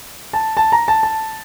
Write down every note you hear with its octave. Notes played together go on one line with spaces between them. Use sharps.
A5
A5
A#5
A5
A5